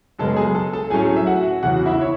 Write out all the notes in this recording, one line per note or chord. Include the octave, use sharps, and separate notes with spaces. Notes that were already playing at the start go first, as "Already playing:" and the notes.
F#2 C#3 G#3 B3 A4 A5
G#4 G#5
A4 A5
A4 A5
A2 F#3 A3 C#4 G#4 G#5
E5
F#4 F#5
E2 C#3 E3 F#4 F#5
E4 E5
C#5